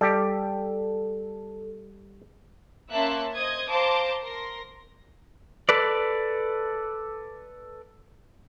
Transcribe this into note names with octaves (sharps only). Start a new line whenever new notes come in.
G3 G4 A4
A#3 C#4 E5 A5 C6 F#6
C5 D#5 D#6 G#6
C5 F5 A5 A#5 C6 D6
A#4 C6 A#6
A4 B4 D5